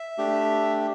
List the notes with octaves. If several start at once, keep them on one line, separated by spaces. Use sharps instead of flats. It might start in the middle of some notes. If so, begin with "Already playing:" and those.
Already playing: E5
A3 D4 G4